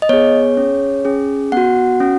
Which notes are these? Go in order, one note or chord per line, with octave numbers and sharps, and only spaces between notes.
D#5
B3 G#4 C#5
C#4 G#4
C#4 G#4
B3 F#4 F#5
C#4 F#4